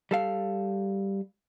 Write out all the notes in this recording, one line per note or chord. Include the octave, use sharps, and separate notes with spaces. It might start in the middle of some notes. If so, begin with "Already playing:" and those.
G3 A4 F5